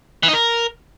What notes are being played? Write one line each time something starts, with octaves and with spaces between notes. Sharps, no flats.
E3
D#4
A#4